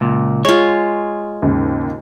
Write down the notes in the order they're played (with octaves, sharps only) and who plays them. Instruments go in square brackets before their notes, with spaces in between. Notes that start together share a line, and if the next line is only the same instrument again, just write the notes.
[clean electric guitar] C#2 A#2
[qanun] G#3 F4 [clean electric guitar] C#5
[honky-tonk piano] D#2 G#2 C#3